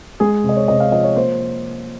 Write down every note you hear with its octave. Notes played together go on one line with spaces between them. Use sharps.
G#3 G#4
C3
D#5
C#5
C3 D#5
F5
F3 D#5
C#5
A#3 C5